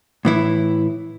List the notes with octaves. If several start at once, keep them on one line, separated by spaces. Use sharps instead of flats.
A2 E3 E4